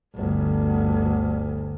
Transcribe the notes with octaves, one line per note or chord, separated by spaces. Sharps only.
G1 D2